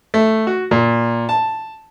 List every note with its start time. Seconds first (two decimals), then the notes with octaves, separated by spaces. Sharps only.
0.14 A3
0.47 F#4
0.71 A#2
1.29 A5